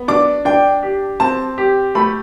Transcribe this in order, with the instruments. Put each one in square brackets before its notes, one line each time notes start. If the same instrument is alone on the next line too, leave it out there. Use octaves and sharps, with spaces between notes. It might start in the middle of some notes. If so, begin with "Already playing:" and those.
Already playing: [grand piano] B3
[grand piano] D4 [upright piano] D6
[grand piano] D4 [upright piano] G5
[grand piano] G4
[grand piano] C4 [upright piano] A5
[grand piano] G4
[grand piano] A3 [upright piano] B5